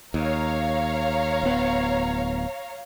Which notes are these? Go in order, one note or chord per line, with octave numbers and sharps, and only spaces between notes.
D#2 C#5 F5 A#5
D1 B3